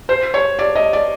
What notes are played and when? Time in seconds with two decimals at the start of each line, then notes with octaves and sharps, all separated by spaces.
0.09 C5
0.34 C#5
0.59 D5
0.75 D#5
0.93 D5